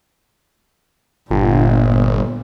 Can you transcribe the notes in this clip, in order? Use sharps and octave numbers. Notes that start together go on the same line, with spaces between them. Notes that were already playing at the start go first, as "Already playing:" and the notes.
G1 A#2